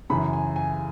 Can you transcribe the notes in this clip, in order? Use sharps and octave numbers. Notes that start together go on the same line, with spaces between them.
F#2 C#3 E3 B5
G#5
G#5